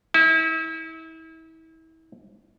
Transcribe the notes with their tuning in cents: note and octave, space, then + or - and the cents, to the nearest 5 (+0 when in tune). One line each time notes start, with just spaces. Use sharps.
E4 -35